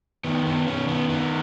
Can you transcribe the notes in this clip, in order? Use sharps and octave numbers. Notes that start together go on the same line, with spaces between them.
D#3 B3
B3
D#3 C#4
B3
D#3 B3